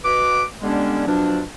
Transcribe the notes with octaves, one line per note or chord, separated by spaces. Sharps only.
B2 B4 D6
D3 G3 G#3 B3 C#4 D4
B2 F3 F#3 D4